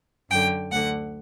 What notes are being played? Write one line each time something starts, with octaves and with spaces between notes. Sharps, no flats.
F#2 D3 G5
D2 D3 F#5